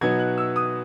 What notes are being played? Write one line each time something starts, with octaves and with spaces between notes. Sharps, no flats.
B2 F#3 B3 D#4 G#6
F#6
E6
D#6